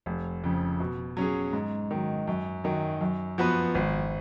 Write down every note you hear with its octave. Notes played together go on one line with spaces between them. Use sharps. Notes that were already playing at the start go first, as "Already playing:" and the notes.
F1
F2 C#3
B2
F#3 C#4 G#4
G#2
D#3 F#3
F#2
D#3 F#3
F#2
F3 B3 F#4 B4
G#1